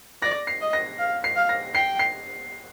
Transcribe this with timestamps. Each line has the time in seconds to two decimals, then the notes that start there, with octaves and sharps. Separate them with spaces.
0.22 D5 A#6
0.47 C7
0.61 D#5
0.73 A#6
0.98 F5
1.24 C7
1.36 F5
1.49 A#6
1.75 G5 C7
1.99 C7